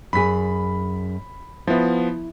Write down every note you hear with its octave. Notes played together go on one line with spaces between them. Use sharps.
F#2 G#4 B5 B6
F3 B3 E4